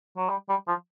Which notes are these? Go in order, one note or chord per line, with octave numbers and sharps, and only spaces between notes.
F#3
G3
G3
F3